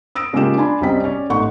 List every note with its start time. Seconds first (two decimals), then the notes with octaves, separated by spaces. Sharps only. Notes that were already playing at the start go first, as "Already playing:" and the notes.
0.15 D#6 E6 A#6 D7
0.33 C#3 G#3 A#3 F4 G4 E7
0.56 D4 D5 G#5 A5 B5 C6
0.81 C2 F#2 G3 C4 D#5 B6
1.03 C#4 C#5 D5
1.30 A1 A3 D#4 F#5 C6 C#6